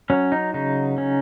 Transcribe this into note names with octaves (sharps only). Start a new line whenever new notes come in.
F#3 C#4
D#4
C#3 D#4
C#4